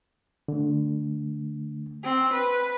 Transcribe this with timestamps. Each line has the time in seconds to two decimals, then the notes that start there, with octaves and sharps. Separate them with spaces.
0.48 D3 A3
2.04 C4
2.34 B4